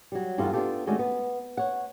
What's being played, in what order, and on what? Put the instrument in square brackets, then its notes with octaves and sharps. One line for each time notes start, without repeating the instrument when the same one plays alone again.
[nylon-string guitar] F#3 G3
E2 G2 G3 F4 F#4 A4
B3 D4 D#4 F4 G4 A4
D#3 G#3 A3 C#4 F#4 D5
B3
C#5 F#5